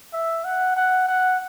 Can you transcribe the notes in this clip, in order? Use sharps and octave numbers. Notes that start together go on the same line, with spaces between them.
E5
F#5
F#5
F#5